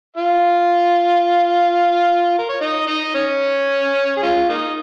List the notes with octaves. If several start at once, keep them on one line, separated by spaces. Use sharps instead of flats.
F4 F5
A#4
C#5
D#4 D#5
D#4 D#5
C#4 C#5
G#4
G#3 C#4 F4
A#3 D#4